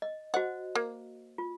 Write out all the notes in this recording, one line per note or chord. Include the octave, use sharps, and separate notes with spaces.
D#5
F#4 C5 D#5 F#5
A#3
F4